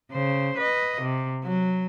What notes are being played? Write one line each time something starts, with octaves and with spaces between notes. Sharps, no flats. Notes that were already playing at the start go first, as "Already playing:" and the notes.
C#3 C5
B4 D#5
C3
F#3